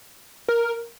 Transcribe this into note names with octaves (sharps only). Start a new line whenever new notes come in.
A#4